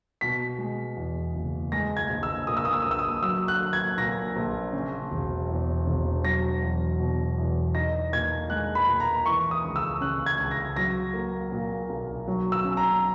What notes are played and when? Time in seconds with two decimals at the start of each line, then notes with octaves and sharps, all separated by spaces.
0.21 B2 B6
0.58 G#3
0.96 E2
1.35 F#1
1.72 G#3 A#6
1.97 G#6
2.09 A#1
2.23 E6
2.47 A#2 D#6
2.57 E6
2.65 D#6
2.73 E6
2.82 A#1 D#6
2.91 E6
2.99 D#6
3.22 F#3 E6
3.48 F#6
3.60 A#3
3.73 G#6
3.98 A#2 A#6
4.36 A#1
4.73 C#3
5.11 E1
5.49 E2
5.86 E1
6.24 F#3 A#6
6.62 E2
7.00 B2
7.38 E2
7.74 D#4 A#6
8.13 A#2 G#6
8.50 G#3 F#6
8.75 B5
8.88 A#2
9.00 A#5
9.25 E3 C#6
9.51 D#6
9.64 C#2
9.76 E6
10.01 C#3 F#6
10.26 G#6
10.38 C#2
10.51 A#6
10.76 F#3 A#6
11.14 A#3
11.52 A#2
11.89 B1
12.28 F#3
12.52 E6
12.64 C#4
12.77 A#5